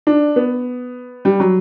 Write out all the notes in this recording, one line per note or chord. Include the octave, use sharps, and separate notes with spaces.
D4
B3
G3
F#3